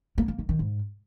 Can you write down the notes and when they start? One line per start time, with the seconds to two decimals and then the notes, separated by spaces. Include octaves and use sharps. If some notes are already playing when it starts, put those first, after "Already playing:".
0.18 A#3
0.28 A#3
0.39 D#3
0.49 D#3
0.59 G#2